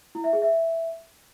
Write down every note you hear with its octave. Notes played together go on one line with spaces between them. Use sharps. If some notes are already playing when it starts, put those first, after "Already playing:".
E4
E5
G#4
E5